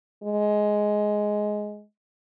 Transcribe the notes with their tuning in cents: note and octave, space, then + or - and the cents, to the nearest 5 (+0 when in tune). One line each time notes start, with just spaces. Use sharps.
G#3 +10